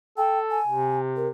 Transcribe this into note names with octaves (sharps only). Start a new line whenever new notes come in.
A4 G5
G#5
C3
A#4